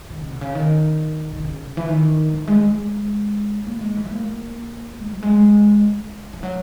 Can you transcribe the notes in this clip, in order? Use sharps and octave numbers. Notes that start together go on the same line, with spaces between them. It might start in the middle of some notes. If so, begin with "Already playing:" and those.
D#3
C#3
B2
C#3
D#3
D#3
C#3
E3
D#3
E3
G#3
G#3
A#3
G#3
E3
A#3
G#3
F#3
G#3
E3
F#3